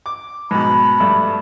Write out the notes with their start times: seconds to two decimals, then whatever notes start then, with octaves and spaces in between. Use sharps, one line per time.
0.06 D6
0.51 G#2 B2 B5
1.00 G2 A3